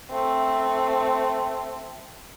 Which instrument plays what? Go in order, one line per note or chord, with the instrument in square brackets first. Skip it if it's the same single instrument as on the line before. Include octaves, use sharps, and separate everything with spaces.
[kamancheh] A3 C4